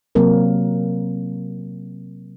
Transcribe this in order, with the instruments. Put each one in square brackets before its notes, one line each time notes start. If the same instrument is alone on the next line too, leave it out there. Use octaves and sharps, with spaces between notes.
[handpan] C3 F#3 A#3 C4 A#4